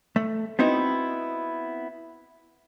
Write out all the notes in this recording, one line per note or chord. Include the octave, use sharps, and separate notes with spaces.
A3
B3 C4 D#4 E4 F#4